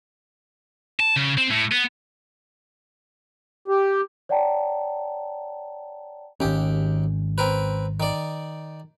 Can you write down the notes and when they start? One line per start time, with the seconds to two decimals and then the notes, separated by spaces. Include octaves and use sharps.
1.00 A5
1.16 C#3
1.37 C4
1.50 A2
1.72 B3
3.68 G4
4.29 C#5 D5 F#5 G5 A5 A#5
6.40 G#1 D#2 C#4 G4
7.38 C4 A#4 B4
8.00 D#3 D5